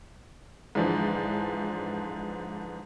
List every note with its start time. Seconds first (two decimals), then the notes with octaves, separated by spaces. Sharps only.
0.75 G#2 D3 E3 F3